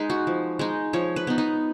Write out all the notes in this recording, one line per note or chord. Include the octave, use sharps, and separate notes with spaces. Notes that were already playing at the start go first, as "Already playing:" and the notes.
Already playing: G#3 D#4 G#4 B4
F#4
F3
G#3 D#4
F3 C#5
B4
B3 D#4
D#4